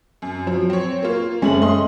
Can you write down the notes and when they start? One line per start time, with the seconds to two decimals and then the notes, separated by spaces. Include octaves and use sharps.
0.22 F#2
0.47 F3 F#3
0.70 C4 C#5
1.03 A#3 F4
1.42 F#1 G#3 A3 C#4 F#7
1.62 A3 D#5 C6